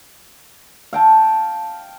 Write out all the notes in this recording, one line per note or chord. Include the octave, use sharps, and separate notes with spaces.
F5 G5 A5